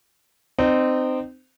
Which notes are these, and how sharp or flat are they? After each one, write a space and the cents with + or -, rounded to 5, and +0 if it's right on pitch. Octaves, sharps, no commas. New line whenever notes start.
C4 -20 D#4 -30